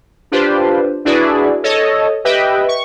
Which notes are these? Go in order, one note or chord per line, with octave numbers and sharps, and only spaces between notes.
D4 F4 G4 B4 C5
D4 E4 F#4 G#4 B4 D5
A4 C#5 D#5
G4 B4 D#5 E5 G5
C#6